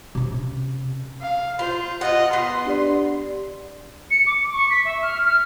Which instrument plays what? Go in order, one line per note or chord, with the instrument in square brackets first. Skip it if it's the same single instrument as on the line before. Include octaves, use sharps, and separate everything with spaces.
[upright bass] C3 C#4
[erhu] F5
[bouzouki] F4 [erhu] C5
[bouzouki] F4 F#5 [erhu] D#5
[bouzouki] B3 [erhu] C6
[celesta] D4 G4 D5
[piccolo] C#7
D6
C#6
B6
E5
F6
F6